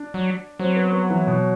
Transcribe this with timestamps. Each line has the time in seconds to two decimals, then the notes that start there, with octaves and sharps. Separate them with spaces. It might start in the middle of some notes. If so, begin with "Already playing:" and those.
Already playing: D4
0.14 F#3
0.59 F#3 C4
0.76 B3
0.93 B3
1.10 E3
1.27 B2